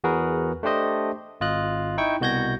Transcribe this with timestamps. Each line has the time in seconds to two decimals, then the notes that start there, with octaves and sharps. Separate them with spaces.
0.04 E2 F#4 G#4 A#4 B4
0.63 A3 D4 G4 C5 D#5
1.41 G#1 F4 D#5 F#6
1.98 D#4 E4 G5 C#6
2.21 C2 B2 F#4 G6 G#6 A#6